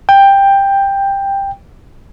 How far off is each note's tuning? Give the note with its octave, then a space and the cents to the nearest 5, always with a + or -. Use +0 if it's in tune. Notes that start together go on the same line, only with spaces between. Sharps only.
G5 +10